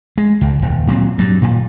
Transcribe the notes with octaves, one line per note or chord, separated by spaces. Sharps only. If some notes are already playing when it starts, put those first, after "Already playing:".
G#3
C#2
D#1
A#2 F#3 G3 C4
G2 F#3
D#1 A#2